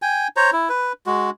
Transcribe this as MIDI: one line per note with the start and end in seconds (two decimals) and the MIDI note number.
0.02 0.28 79
0.02 0.28 80
0.36 0.51 72
0.36 0.51 73
0.36 0.51 82
0.53 0.69 64
0.69 0.93 71
1.06 1.30 56
1.06 1.30 66